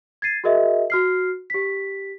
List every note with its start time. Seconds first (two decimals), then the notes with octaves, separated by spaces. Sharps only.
0.22 G#6 A6 C7 D#7
0.44 F#4 G#4 A#4 D#5 E5
0.90 F#4 F6 C7
1.50 G4 B6